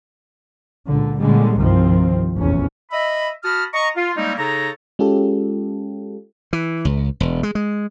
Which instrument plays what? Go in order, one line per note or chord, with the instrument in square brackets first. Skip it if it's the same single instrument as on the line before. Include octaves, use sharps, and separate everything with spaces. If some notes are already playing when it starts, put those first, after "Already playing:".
[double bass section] C#2 A#2 D3
A#2 D3 G3 G#3 C#4
C2 G2 D#3 F3 C4
F1 A#1 E2 C#4
[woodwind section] D#5 E5 B5
F#4 A5 B5 D#6 F6
D#5 A#5 C#6
F4
G3 G#3 A#3 C4 C#4 D#4
C#3 D#4 A4 C#5 A#5
[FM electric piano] G#3 C#4 F4 G4 A4
[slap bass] E3
C#2
E1
G#3
G#3